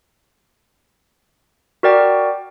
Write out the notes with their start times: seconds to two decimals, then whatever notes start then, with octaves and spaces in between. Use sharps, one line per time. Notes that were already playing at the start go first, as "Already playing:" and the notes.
1.83 F#4 A#4 D5 G5